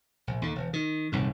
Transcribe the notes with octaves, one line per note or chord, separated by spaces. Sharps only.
A#1
D#2 D3
E1
D#3
D#1 C2 G#2